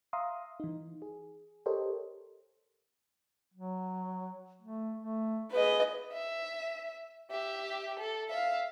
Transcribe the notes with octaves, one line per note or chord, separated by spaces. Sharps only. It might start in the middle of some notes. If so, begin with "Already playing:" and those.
E5 F5 A#5 C6 D#6
E3 D#4
G#4
G4 A4 A#4 C5 C#5 D#5
F#3
A3
A3
G#4 B4 D#5
E5
G4 E5
A4
E5 F5